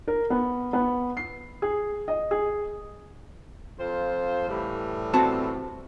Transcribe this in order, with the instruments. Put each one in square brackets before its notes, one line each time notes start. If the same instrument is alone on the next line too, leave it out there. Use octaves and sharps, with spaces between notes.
[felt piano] A#4
B3
B3
C7
G#4
D#5
G#4
[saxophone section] F2 F4 C5
A2 E3 G3
[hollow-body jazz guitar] C4 F#4 A5